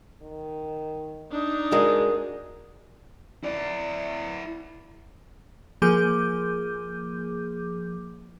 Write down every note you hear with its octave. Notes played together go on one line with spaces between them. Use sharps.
D#3
D4 D#4
G#3 F#4 A#4 D5 D#6
E4 D5
F3 A#3 G#4 D6 G6